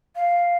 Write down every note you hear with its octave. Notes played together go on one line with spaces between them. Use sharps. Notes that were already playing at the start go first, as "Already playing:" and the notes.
F5